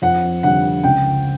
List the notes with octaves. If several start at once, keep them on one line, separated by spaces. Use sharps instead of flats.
F2 F#5
D3 G3 F#5
C#2 G5